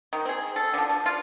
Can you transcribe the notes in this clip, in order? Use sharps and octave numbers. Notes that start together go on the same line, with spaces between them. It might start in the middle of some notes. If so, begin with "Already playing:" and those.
D#3
C4 G#4
A4
D3 F3
F3
F4